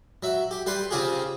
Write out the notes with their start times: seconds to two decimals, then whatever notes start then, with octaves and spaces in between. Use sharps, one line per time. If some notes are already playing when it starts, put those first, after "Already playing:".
0.23 F#3 E5
0.51 G4
0.66 G3 G4 B4 C6
0.91 C#3 C4 F4 G4 G#4